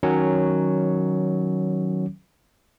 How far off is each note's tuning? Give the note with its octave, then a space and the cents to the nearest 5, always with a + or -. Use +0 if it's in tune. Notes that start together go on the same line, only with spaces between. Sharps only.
D#3 +0 F#3 +5 C#4 +0